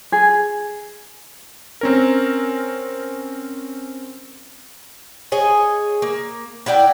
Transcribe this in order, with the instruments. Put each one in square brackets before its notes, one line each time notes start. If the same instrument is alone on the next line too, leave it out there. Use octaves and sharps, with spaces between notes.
[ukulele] G#4
[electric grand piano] C4 C#4 A#4
[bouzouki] G#4 C#5 D#5 G#5
A#3
E4 F#4 D5 G5